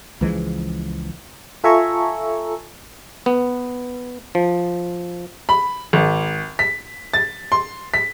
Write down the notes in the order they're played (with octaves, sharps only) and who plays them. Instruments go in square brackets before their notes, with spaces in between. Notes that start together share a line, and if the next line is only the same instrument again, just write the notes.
[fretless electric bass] C#2 E3 F3 G#3
[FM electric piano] F4 A4 E5 G#5 A#5 C#6
[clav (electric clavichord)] B3
F3
[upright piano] B5
G#1
B6
A6
C6
B6